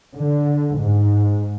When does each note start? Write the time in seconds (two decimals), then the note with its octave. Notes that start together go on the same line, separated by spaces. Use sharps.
0.16 D3
0.78 G#2